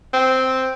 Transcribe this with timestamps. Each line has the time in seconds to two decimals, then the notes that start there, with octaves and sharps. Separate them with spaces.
0.14 C4